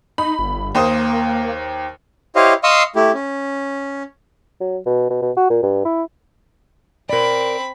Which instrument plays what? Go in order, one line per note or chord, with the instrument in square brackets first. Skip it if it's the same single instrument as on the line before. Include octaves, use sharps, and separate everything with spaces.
[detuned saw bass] D#4 [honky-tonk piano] B5
[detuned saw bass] G1
[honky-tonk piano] D#2 C5 D#6 [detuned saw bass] A#3
[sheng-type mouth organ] E4 G4 C5 C#5 D#5 F5
D#5 F5 C6 C#6 D#6 E6
A3 E4 G4
C#4
[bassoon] F#3
B2
B2
B2
F#4
A#2
G2
E4
[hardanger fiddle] C4 B5 [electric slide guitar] A#4 D5